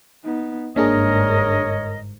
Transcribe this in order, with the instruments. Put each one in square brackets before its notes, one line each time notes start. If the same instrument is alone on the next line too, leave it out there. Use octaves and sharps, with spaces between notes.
[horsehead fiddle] B3 D#4
[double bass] G1 G#2 [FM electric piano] A#3 D4 G#4 [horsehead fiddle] A#4 [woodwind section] C#5 D#5